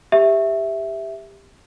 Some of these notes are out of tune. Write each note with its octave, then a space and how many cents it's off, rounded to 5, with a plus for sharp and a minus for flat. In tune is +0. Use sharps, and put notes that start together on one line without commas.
G4 +15 E5 +0